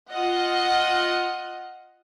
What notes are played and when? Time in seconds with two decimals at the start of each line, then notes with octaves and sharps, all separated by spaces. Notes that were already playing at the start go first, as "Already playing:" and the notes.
0.12 F4 D#5 F#5